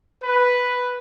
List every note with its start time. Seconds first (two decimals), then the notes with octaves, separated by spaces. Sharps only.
0.23 B4